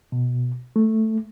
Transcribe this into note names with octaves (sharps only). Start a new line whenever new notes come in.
B2
A3